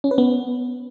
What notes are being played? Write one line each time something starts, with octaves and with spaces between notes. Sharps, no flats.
C#4
B4
B3